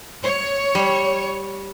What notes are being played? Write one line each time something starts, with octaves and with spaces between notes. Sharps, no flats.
C#5
G3